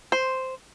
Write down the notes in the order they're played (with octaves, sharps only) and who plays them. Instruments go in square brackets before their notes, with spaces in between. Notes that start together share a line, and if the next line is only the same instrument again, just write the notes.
[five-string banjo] C5